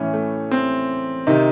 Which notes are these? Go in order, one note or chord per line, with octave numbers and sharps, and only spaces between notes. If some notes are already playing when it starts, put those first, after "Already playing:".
Already playing: A2 E3 C#4
A3
C4
C3 D#3 D#4